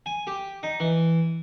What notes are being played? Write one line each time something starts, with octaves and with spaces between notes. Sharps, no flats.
G#5
G4
D#4
E3